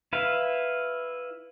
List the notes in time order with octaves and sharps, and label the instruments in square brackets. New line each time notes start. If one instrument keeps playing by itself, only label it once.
[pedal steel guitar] E4 B4 F5